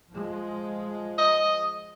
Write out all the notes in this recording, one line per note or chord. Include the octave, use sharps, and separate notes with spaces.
F3 G#3
D#5